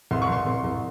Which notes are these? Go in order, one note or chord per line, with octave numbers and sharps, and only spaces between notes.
C2 C6
C#6
C2 C6
C2
C2